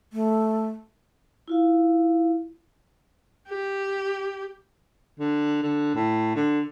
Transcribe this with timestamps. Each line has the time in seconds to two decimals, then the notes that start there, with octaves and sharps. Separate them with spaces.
0.13 A3
1.48 E4 F4 F5
3.49 G4
5.20 D3
5.62 D3
5.95 A2
6.36 D3